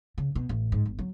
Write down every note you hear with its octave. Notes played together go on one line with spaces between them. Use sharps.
C#3
B2
A1
G#2
G1
F#3